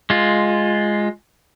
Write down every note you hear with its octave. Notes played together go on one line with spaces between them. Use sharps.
G#3 F4